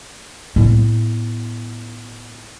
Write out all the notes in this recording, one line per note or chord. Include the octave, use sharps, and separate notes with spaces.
A2 B3